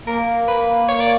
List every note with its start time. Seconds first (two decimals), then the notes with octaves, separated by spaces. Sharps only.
0.06 A#3 A#4
0.48 B4
0.88 C#5
1.00 D5